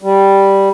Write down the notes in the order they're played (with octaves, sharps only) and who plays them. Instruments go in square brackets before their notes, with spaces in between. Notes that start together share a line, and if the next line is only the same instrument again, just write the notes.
[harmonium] G3